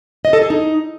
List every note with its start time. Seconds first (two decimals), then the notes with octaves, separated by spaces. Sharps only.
0.25 D#5
0.33 A4
0.42 G#4
0.50 D#4